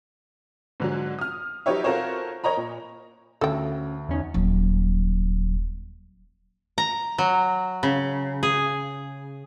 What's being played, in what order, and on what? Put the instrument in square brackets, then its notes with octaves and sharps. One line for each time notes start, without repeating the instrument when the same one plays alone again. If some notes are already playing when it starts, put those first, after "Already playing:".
[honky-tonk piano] G#2 D3 F#3
D#6 F6
F#3 D#4 G4 B4 C#5 E5
F4 F#4 A4 A#4 C5 C#5
A#4 C#5 D#5 A#5 B5
A#2
[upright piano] D2 [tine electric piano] C#4 [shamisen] A4 G5
[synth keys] E2 C#4 D#4
[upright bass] D#1 F#3
[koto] A#5
F#3
C#3
G#4